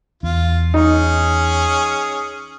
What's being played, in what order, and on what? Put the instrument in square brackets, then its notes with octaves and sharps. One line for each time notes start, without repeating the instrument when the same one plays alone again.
[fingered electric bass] E2 [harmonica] F4
[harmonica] C#4 G#4 [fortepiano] D#4